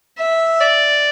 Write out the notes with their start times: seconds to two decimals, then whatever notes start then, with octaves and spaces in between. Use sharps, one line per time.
0.18 E5
0.60 D5